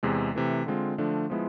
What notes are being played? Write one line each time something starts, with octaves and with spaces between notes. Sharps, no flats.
E2 C3 G#3
C3 E3 A3
D3 G#3 C4 F4
D3 F3 A3 D4
F3 G#3 B3 E4